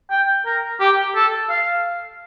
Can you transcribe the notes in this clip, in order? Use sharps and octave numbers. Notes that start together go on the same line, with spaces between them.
G5
A#4
G4
A4
F5